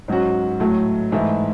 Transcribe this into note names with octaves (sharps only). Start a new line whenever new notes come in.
G#2 F#3 C#4 F#4
A2 F#3 A3
G#2 E3 A3 E4